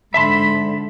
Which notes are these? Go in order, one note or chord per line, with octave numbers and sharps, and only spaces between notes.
G#2 D3 E5 A5 B5 C6